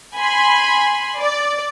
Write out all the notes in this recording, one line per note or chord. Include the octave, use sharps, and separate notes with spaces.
G#5 B5 C6
D5